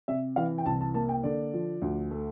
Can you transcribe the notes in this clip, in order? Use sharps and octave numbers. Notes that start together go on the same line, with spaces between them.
C3 E5
E3 F5
G5
C2 A5
A5
A#3 A5
G5
D3 D5
F3
D2
A3